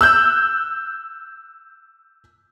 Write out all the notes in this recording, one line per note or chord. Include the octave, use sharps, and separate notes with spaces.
E6 F#6 G6